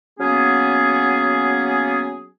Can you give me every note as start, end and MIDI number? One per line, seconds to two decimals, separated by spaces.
0.20 2.26 54
0.20 2.26 58
0.20 2.26 59
0.20 2.26 61
0.20 2.26 68